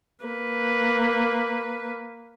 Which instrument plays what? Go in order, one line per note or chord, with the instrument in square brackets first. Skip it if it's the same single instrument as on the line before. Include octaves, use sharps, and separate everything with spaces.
[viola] A#3 B4